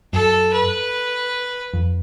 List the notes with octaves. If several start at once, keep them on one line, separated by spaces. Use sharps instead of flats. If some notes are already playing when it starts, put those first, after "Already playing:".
F#2 A4
B4
F2